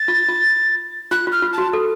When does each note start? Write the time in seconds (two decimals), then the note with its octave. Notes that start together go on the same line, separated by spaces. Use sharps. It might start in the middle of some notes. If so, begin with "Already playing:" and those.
Already playing: A6
0.08 F4
0.29 F4
1.11 F4 F#6
1.27 F4 F6
1.42 F4
1.53 A5
1.58 F#4
1.73 A4